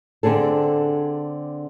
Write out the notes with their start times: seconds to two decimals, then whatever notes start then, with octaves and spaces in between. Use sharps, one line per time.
0.23 D3 C4 D4 G#4 A4